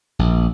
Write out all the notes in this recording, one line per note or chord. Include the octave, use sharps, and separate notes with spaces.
A#1